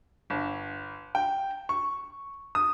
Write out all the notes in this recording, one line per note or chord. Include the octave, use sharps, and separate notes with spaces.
G1
G5
C#6
D#6